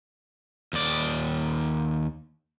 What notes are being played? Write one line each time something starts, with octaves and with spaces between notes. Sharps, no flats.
D#2 D5